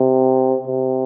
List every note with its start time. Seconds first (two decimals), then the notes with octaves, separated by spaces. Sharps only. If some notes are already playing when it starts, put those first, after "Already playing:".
Already playing: C3
0.67 C3